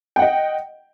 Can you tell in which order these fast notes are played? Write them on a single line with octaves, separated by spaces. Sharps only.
G5 F#5 D#5